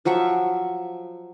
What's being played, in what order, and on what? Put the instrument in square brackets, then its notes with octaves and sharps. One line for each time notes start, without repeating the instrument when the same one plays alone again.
[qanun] F3 F#3 E5 C#6